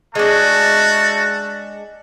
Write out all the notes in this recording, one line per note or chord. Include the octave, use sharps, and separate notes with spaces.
G#3 A3 D4 F#4 A5